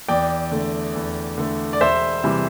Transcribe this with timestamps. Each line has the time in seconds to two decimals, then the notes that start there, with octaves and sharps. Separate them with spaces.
0.08 E2 D5 G5
0.52 D3 A3
0.95 E2
1.38 D3 A3
1.73 D5
1.81 E1 C5 E5
2.24 C3 E3 G3